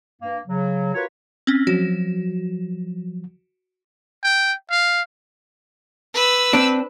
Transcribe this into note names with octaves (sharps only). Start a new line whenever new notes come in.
G2 A#3
C#3 F#3
F4 F#4 A#4 B4 C#5
C4 C#4
F3 F#3 F#4
G5
F5
B4 E6
C4 D4